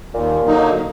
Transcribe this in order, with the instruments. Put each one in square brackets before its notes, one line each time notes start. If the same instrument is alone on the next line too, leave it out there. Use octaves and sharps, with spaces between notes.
[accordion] D#2 [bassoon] A#2
[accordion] D3 F#3 A#3 D#4